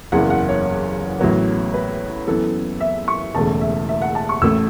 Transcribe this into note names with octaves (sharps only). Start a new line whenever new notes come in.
F#1 E2 C#3 E3 F#5
F#5
C#5
A1 A2 F#3 B3
B4
F#2 E3 B3 A4
E5
C#6
E1 E2 C#3 A3 A5
E5
E5
F#5
A5
C#6
A1 A2 A3 E6